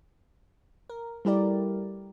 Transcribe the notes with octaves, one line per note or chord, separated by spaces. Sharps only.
A#4
G3 A3 E4 G4 A#4 D5